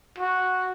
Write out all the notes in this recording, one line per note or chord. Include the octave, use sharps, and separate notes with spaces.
F#4